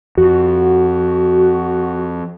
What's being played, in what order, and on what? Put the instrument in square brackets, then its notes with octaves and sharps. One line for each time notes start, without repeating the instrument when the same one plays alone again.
[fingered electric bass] F2 [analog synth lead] F#4